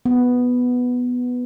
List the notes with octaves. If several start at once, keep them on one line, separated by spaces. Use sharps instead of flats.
B3